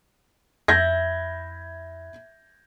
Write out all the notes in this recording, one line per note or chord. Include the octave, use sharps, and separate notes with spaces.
F2 E4 G6 G#6 A#6